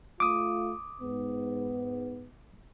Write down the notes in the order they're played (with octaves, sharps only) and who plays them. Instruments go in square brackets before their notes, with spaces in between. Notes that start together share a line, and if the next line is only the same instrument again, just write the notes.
[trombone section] A3 F4 [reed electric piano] D6 D#6
[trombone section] G#2 B3